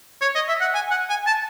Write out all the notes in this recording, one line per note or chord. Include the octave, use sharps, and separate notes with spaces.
C#5
D#5
E5
F#5
G#5
F#5
G#5
A5